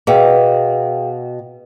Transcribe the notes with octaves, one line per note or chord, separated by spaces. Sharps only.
B2 G#4 F5 G5